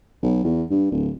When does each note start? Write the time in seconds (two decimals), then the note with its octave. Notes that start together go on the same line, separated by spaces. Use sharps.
0.22 B1
0.44 E2
0.70 G2
0.91 D1